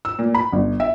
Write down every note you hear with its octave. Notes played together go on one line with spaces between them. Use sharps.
E6
A#2
B5
G1
E5